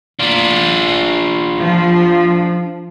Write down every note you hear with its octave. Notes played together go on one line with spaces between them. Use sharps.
D4 F4
F3